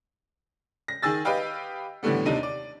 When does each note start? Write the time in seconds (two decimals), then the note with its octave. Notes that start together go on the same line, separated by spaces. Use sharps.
0.88 A#6
1.03 D#3 G#4 G#5 E6 A6
1.25 G4 B4 D#5 F5 G5
2.03 A2 D3 E3 G3 A3 B3
2.26 D#2 C3 D4 D#4 D#7
2.43 D5